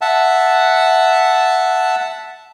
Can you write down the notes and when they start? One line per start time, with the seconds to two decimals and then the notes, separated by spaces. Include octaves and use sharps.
0.01 E5 F#5 A5